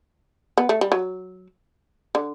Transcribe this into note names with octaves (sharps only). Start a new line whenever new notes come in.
B3
A3
G3
F#3
D3